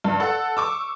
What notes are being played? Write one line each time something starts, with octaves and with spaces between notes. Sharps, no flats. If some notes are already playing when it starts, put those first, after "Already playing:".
G2
A4 F#5
C#6 D6 E6